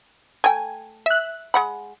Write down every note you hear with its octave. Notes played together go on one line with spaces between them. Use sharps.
A3 G5 G#5
E5 F#6
G#3 F#5 B5